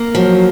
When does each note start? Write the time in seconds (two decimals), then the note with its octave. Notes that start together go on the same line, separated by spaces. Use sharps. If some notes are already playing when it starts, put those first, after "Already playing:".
Already playing: A#3
0.15 F3 F#3